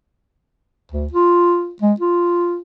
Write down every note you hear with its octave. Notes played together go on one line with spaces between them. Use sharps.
D2
F4
G#3
F4